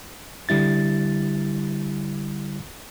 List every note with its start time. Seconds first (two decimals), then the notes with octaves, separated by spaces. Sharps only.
0.49 D3 G3 E4 A6